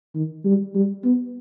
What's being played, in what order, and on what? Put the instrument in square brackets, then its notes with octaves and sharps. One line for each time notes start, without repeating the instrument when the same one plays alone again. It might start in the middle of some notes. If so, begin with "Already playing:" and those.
[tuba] D#3
G3
G3
B3